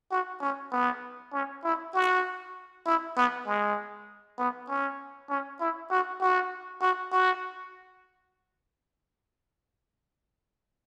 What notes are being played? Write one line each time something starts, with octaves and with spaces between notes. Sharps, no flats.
F#4
C#4
B3
C#4
E4
F#4
E4
B3
G#3
B3
C#4
C#4
E4
F#4
F#4
F#4
F#4